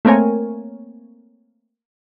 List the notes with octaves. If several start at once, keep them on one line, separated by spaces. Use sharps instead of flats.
A3 A#3 C4 A#4 C#5 G#5